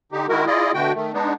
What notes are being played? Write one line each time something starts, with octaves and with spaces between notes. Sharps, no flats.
D3 D#4 G4
D#3 G#3 E4 F#4 A#4
E4 F4 G#4 D5 D#5
B2 D3 A3 F#4 G5
D#3 A3
G#3 B3 D4 D#4